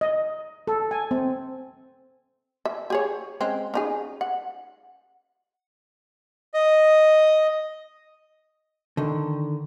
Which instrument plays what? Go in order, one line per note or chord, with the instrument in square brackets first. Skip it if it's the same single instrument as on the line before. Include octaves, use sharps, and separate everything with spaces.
[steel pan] D#5
A4
G#5
C4
[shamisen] E5
G4 G#4 C#5
G#3 C4 C#4
C#4 D#4 G#4
F#5
[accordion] D#5
[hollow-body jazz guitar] D3 D#3